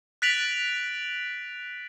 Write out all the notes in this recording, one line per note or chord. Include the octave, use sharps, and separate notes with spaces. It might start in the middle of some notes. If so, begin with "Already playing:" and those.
F#6 A6 B6 D7 F7 F#7